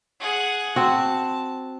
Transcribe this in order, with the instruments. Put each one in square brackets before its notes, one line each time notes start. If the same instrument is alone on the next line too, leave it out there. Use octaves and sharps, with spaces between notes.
[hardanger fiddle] G#4 F#5
[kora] C4 F#4 [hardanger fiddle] A5